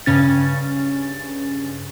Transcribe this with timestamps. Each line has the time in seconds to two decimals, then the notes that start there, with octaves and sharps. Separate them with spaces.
0.06 G2 C#3 C#4 A6